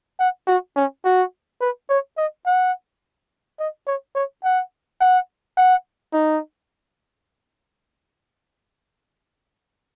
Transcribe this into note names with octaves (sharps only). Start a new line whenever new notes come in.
F#5
F#4
C#4
F#4
B4
C#5
D#5
F#5
D#5
C#5
C#5
F#5
F#5
F#5
D#4